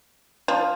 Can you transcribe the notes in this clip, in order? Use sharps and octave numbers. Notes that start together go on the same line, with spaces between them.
F3